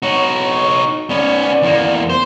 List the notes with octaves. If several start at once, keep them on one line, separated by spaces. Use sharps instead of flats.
D#4 F#4 C#5
B3 C#4 D5
E2 A#3
C5